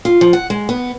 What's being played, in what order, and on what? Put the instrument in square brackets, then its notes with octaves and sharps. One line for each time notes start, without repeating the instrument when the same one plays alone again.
[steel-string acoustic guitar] F4
F3
F#5
G#3
B3